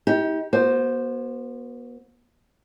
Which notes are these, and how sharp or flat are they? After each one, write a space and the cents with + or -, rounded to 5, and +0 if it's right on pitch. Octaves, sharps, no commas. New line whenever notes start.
D#4 +45 G4 +0
B3 -40 F#4 +0 C5 +0